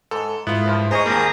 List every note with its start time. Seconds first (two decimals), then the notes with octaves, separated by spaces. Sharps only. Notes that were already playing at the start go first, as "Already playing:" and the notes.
0.11 G#2 A4
0.47 G#2 B3 E4 F4
0.66 C2 G2 F3
0.91 G#4 C5 D#5 A#5 C#6 D#6
1.06 D#2 G3 A#3 C4 A#6